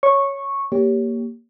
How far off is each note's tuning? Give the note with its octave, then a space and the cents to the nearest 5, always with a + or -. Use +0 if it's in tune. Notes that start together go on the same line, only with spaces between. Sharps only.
C#5 +0 C#6 -10
A#3 +0 G4 +0 C#5 +15